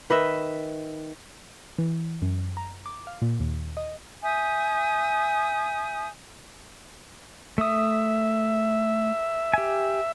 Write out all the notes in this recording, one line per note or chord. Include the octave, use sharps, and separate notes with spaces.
D#3 B4 D#5 E5
E3
F#2
A#5
D6
F5
A#2
D#2
D#5
E5 G#5 D#6 G6
A3 E5 D#6
G4 G#5